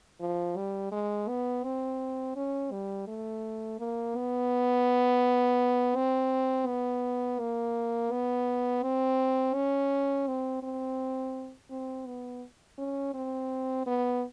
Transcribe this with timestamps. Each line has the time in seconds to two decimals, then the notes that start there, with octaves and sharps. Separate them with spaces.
0.21 F3
0.57 G3
0.92 G#3
1.28 B3
1.64 C4
2.36 C#4
2.72 G3
3.08 A3
3.79 A#3
4.16 B3
5.96 C4
6.67 B3
7.39 A#3
8.11 B3
8.83 C4
9.54 C#4
10.27 C4
10.63 C4
11.70 C4
12.06 B3
12.78 C#4
13.14 C4
13.86 B3